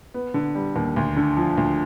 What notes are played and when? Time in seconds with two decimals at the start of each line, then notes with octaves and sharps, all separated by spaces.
0.14 B3
0.34 D3
0.55 G3
0.76 D#2
0.96 D2
1.16 D3
1.37 F3
1.57 D2